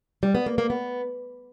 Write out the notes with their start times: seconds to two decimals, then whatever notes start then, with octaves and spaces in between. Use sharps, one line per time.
0.23 G3
0.35 B3
0.46 A#3
0.58 A#3
0.70 B3